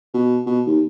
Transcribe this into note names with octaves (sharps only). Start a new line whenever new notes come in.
B2
B2
D#2